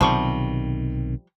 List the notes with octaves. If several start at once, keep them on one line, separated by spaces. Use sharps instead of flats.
B1 C3 D#3 F3 G3 C#6